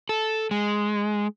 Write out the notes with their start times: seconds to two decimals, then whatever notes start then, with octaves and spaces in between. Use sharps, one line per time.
0.09 A4
0.51 G#3